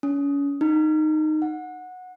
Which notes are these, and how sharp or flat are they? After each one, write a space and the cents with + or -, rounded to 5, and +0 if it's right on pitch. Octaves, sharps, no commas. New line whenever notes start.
C#4 +35
D#4 -10
F#5 -15